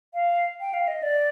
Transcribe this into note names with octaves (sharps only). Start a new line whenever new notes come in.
F5
G5
F5
D#5
D5